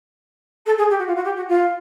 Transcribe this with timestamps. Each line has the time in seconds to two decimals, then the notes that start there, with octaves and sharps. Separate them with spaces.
0.66 A4
0.78 G#4
0.90 G4
0.98 F#4
1.07 F4
1.16 F#4
1.24 G4
1.36 F#4
1.48 F4